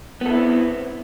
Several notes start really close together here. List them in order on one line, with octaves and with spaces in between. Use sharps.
B3 A4 E4 C4